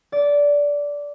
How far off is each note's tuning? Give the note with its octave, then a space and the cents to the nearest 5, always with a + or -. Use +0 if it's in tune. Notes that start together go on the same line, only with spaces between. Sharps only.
D5 -15